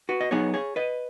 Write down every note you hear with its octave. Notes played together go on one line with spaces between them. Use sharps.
F#4 B4
D#5
F#3 B3 D#4 G#4 C#5
G#4 C#5
B4 D#5